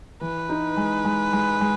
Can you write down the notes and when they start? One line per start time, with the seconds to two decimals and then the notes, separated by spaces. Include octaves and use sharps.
0.21 E3 B4
0.49 D#4
0.77 G#3
1.05 G#3
1.33 G#3
1.61 G#3